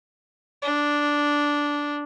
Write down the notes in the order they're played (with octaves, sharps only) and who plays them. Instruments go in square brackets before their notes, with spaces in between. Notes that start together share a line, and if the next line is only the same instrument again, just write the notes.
[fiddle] D4